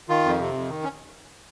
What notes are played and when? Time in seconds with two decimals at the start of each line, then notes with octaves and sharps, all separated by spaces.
0.09 D#3 F4
0.24 F2
0.39 C3
0.54 F2
0.69 D#3
0.83 C#4